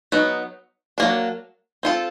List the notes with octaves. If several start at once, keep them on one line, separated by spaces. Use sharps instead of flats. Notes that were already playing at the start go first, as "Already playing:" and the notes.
F#3 B3 D#4
F#3 A#3 D4
C4 F4 A4